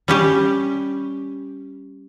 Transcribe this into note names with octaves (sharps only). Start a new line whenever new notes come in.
G3 C#4 G4